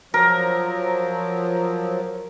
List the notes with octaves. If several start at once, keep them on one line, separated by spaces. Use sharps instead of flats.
F3 F#3 A#4